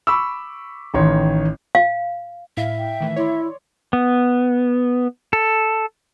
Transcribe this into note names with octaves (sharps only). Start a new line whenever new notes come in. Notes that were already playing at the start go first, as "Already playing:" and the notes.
B5 C#6 D6 E6
A1 D#3 C#5 C6
F5
A2 E4 E5 F5
G5
D#3 E3 A3
E4 C#5 D5 C6
B3
A4